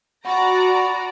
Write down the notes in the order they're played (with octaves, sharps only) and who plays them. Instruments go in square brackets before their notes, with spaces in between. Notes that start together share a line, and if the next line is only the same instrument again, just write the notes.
[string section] F#4 D5 A#5 [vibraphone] F#5 B5 C#6